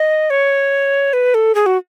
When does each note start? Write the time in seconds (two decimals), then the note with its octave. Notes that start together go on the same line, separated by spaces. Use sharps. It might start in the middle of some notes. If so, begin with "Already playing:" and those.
Already playing: D#5
0.30 C#5
1.13 B4
1.34 A4
1.55 G#4
1.66 F#4